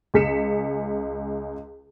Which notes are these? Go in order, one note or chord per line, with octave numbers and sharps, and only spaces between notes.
C#2 G#4 B6 C#7 E7